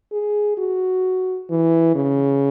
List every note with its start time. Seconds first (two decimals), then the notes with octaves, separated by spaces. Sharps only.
0.12 G#4
0.58 F#4
1.50 E3
1.95 C#3